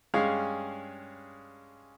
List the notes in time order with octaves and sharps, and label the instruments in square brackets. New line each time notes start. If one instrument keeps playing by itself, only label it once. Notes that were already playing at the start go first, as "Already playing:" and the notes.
[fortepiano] G2 G#3 C#4 G#4 F5